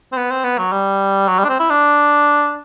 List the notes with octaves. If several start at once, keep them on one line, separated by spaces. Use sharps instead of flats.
C4
B3
C4
B3
F#3
G3
F#3
G3
D4
C4
E4
D4